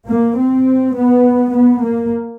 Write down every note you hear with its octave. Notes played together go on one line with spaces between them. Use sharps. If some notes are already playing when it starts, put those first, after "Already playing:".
A#3
C4
B3
B3
A#3